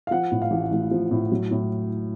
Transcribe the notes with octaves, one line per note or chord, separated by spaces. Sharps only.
F5
F3 F#5
A2
F5
A1
A1
F3
A2
F#3
A2